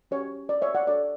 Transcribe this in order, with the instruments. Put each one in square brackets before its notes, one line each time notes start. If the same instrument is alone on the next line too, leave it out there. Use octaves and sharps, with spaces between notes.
[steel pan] C#4 G4 C#5
D5
C#5 E5
D5 F#5
D4 A4 C#5 D5